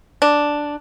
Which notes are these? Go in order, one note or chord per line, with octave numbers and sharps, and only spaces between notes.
D4